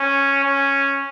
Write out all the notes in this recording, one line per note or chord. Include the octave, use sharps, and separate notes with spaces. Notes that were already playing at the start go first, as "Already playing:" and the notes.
Already playing: C#4
C#4